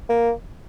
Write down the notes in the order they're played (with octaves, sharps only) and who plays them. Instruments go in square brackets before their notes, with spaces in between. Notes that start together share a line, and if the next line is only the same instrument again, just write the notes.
[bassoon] A#3